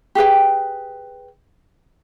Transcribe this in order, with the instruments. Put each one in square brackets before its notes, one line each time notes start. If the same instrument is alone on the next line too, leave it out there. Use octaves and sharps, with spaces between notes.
[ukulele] G4 G#4 B4 G5